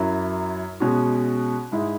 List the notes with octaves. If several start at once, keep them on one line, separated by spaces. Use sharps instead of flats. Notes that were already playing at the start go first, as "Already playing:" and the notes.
Already playing: F#2 F#3 E4
B2 G#3 C#4 F#4
G#2 G#3 E4